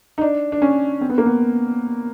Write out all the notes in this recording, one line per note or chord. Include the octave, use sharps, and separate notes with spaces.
D#4
D4
D4
C#4
C4
B3
A#3
B3